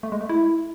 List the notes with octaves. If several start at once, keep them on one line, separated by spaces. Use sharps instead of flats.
A3
G#3
A3
E4